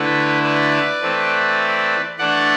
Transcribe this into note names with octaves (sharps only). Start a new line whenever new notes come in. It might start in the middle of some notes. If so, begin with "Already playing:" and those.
Already playing: D3 A3 E4 B4
B4 D5
E3 A3 C4
E3 A3 D4 D5 F#5